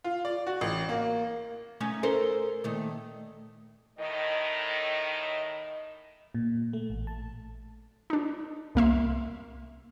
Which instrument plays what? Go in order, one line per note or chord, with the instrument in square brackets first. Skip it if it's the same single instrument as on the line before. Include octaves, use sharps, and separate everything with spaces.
[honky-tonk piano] F4
D5
F#4
A1
A#3
[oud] A3 C#4 D#4
A4 A#4 C5
A#2 D#3 A3
[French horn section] A2 D#3 [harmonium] D#5
[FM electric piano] A#2
A3
A1
A5
[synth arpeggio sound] D4 D#4
C2 A#3 E5 C6